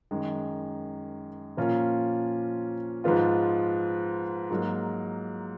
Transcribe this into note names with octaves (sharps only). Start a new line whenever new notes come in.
F#2 D#3 G#3
A#2 F3 A#3 C#4 F4
G#2 F3 B3 F4
G#2 F#3 A#3